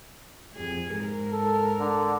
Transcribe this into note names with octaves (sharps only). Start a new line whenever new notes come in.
F2 G#4
G#2 A#4
A4
D3